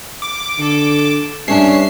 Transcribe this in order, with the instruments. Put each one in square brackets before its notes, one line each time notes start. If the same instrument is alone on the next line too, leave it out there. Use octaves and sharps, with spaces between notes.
[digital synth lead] D6
[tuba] D3 [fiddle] A4
[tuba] G2 [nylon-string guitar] C#4 D4 [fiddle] C#5 E5 [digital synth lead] C7